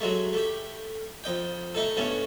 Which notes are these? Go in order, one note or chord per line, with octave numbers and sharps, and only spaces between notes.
F#3 G#3 A3
A3 G4
F2 D#5 G5
A3 D#4 A4
G2 A3 B3 C#4